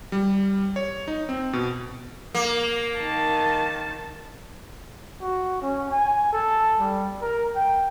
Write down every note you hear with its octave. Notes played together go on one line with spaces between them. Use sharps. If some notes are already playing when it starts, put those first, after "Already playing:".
G3
C#5
D#4
C4
B2
A#3
D#3 A5
F#4
C#4
G#5
A4
G3
A#4
G5